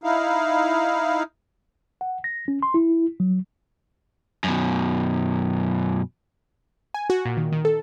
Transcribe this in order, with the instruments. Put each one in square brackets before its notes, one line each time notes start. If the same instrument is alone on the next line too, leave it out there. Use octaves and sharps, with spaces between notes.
[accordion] D#4 E4 F5
[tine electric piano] F#5
A#6
C#4
C6
E4
F#3
[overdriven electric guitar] F#2 B2
[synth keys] G#5
F#4
A#2
D#3
D#3
A4